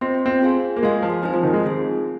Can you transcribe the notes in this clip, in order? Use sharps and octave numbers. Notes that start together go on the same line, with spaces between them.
C4 F4 C5 D#5
C4
F4 G#4 F5 G#5
A#3
G#3 F4 G#4 F5 G#5
F3
F3 C4 D#4 C5 G#5
F3
D#3
G#3
C4 F4 G#4